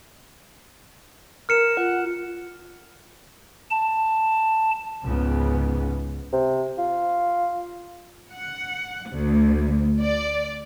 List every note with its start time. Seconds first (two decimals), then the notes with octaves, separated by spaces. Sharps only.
1.49 A#4 F6 C#7 E7
1.77 F4 F#5
3.70 A5
5.04 C#2 G#2 C#3 B3
6.32 C3
6.78 F4
8.31 F#5
9.10 D2
10.01 D5